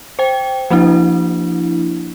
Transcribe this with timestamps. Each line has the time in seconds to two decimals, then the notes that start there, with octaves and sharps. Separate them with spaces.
0.19 C5 G5
0.70 F3 A#3 D4 E4